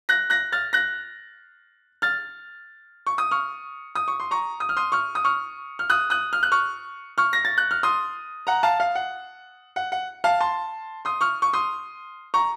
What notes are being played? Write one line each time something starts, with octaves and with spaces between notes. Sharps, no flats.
F#6 A#6
F#6 A#6
F6 A6
F#6 A#6
F6 A6
C#6
D#6
C#6 F6
D#6
C#6
C6
A#5 C#6
D#6
F6
C6 D#6
C#6 F6
D#6
C#6 F6
F6
D#6 F#6
D#6 F#6
F6
F#6
C#6 F6
C#6 F6
A#6
A6
F#6
F6
C6 D#6
F#5 A#5
F5 A5
F5
F#5
F#5
F#5
F5 A5
A5 C6
C6 D#6
C#6 F6
C#6
C6 D#6
A#5 C#6